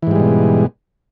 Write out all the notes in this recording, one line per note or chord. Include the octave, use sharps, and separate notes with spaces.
G#2 B2 E3 G3 G#3